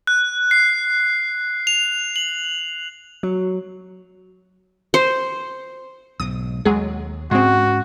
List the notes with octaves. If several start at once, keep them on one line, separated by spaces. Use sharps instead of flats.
F#6
C7
F7
F#7
F#3
C5
B1 G#2 D#6
D#2 F#3 G#3 G#4
G#2 G#3 C4 C#4 F#4